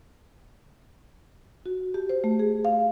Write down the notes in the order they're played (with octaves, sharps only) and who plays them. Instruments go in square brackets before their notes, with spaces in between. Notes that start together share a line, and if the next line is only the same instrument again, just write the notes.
[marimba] F#4
G4
C5
A3
G#4
F5